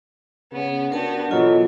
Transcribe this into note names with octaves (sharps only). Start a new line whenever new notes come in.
C#3 B3 C#4
B3 D4 F#4 G4 A#4 A5
B2 E3 F#3 F4 A4 D#5